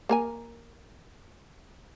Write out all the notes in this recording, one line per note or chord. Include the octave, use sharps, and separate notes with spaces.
A#3 A#4 G#5